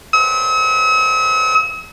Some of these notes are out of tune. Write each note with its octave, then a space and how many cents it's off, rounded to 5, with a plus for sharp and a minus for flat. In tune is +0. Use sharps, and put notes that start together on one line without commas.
E6 -45